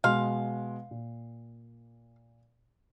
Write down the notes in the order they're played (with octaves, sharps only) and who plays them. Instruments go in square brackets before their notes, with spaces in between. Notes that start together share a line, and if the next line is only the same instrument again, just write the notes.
[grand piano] B2 G#3 C6 [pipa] F5
[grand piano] A#2